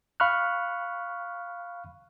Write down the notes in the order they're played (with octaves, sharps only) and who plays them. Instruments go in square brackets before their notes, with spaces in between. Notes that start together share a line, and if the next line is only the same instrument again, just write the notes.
[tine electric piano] F5 B5 C#6 F6 F#6